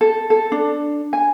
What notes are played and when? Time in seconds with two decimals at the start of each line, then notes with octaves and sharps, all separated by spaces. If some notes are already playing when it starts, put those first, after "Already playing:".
0.01 A4
0.30 A4
0.52 D4
1.13 G#5